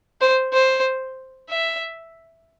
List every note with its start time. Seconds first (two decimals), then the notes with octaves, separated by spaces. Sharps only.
0.21 C5
0.53 C5
1.50 E5